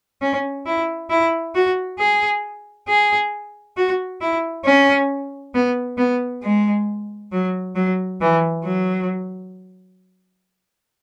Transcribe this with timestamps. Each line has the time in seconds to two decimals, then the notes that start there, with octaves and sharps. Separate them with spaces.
0.21 C#4
0.66 E4
1.10 E4
1.55 F#4
1.98 G#4
2.88 G#4
3.77 F#4
4.21 E4
4.65 C#4
5.54 B3
5.98 B3
6.43 G#3
7.32 F#3
7.75 F#3
8.21 E3
8.64 F#3